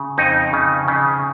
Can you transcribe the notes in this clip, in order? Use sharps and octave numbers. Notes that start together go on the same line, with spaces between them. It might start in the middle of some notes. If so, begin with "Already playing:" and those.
Already playing: C#3
F2 D#4
C#3
C#3